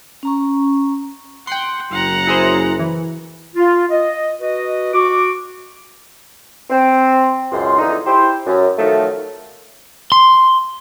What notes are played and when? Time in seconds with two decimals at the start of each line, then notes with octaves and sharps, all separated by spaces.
0.23 C#4 A#5 C#6
1.47 F#5 G5 C6
1.91 F#1 F#2 F#5 A#5
2.27 E4 G#4 C5
2.80 E3
3.56 F4
3.90 D#5
4.41 F#4 B4 D#5
4.93 F#4 D6
6.70 C4
7.52 C#2 F#2 B2 C6
7.79 F2 D3 E3 D#4
8.06 E4 G4 C5
8.46 F#2
8.78 D#3 F3 F#3 A3
10.12 C6